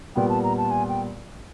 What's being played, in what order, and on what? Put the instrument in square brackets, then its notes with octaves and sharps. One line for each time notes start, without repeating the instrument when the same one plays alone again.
[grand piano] A#2 G3 B3 [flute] G5
[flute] A5
A#5
A5
G#5
G5